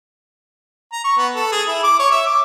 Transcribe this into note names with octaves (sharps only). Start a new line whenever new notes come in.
A#5
C#6
B3
A4
G#4
E4
D6
C#5
E5
D6